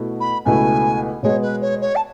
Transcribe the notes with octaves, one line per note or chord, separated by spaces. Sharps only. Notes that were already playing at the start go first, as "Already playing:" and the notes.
Already playing: B2 A3 E4
B5
C#2 B2 A3 E4 G#5
B2 G#3 B3 C#5
B4
C#5
C#5
A5